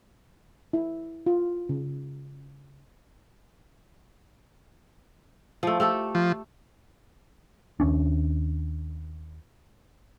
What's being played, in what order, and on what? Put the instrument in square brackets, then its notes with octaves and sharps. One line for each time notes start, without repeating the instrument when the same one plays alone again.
[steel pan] E4
F4
C#3
[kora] F3 A3
A3 G4 A4
[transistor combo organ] F3
[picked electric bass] D#2 C#4 D4